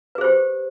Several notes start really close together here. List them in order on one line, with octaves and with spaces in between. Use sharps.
B4 G#4 C5 G4